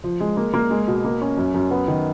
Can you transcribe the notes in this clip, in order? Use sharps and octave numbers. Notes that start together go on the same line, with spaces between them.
F3
G#3
A#3
A#3
G#3
B2
A#3
C#4
F#2
F#2
B3
D#3